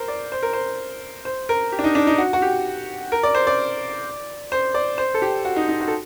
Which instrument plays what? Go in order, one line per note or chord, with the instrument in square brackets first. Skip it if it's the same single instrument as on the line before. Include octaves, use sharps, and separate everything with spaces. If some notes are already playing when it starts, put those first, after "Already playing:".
Already playing: [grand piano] A#4 C5
D5
C5
A#4
C5
C5
A#4
G4
D4
D#4
D4
D#4
F#4
F#4
G4
A#4
D5
C5
D5
C5
D5
C5
A4
G4
F#4
D#4
D#4
F#4
A4